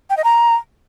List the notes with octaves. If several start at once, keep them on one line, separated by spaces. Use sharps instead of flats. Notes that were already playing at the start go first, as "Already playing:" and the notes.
G5
D#5
A#5